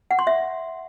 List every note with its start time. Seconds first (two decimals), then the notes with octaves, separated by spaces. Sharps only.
0.11 F#5
0.19 C6
0.27 E5